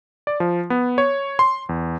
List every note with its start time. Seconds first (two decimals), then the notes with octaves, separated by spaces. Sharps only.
0.27 D5
0.40 F3
0.70 B3
0.98 C#5
1.39 C6
1.69 E2